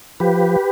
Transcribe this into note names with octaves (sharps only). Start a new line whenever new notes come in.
F3 G4 B4